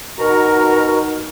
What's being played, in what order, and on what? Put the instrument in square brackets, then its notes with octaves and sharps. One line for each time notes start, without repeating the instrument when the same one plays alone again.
[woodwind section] B2 A#5 C#6 [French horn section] D#4 F#4 [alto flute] A#4